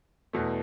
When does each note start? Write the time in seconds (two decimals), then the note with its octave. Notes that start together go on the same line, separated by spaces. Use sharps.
0.33 E2 B2 A3